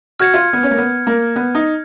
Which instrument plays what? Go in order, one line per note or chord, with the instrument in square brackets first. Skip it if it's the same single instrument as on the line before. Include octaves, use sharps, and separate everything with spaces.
[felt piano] F#4 [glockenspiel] F6 G#6 C#7
[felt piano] F4
B3
C#4
A#3
B3
A#3
B3
D#4